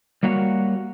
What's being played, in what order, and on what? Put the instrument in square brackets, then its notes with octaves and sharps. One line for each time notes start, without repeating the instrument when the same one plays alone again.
[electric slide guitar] G3 A#3 F#4 C#5 F#5